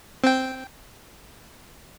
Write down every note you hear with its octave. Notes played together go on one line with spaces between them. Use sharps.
C4 G5